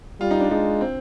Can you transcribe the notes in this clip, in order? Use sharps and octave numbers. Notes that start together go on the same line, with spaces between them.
G3 F4
D#4
D4
G#3 D#4
C4